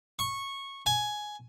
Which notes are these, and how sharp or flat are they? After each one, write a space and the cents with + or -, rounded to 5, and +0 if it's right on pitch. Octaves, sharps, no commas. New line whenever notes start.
C#6 -15
G#5 +10